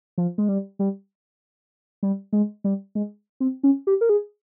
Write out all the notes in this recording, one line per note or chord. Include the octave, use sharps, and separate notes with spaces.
F3
G#3
G3
G3
G3
G#3
G3
G#3
C4
C#4
G4
A#4
G#4